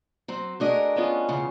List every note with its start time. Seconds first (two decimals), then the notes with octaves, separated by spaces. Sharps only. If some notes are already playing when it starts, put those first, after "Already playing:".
0.28 F#3 C4
0.60 A3 D4 F#4 G#4 A#4 D#5
0.96 B3 C#4 F4
1.29 E2 C#3